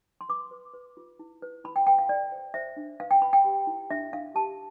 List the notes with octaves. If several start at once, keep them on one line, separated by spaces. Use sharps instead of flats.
C6
B4 D6
B4
B4
F4
E4
B4
E4 B5
G5
B4 G5
F5
A4 D5
C5
C5 E5
D4
B4 F5
G5
B4 B5
G5
G4
E4
D4 E5
D4 F5
G4 A5